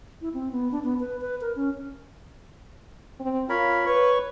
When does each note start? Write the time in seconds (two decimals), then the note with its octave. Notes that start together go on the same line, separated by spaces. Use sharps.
0.21 E4
0.34 C4
0.52 B3
0.72 D4
0.84 B3
1.00 B4
1.21 B4
1.41 A#4
1.56 C#4
3.20 C4
3.49 F4 A#4 C#5 B5
3.86 B4 C#5 C#6